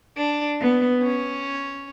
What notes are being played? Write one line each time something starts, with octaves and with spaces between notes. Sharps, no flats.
D4
B3
C#4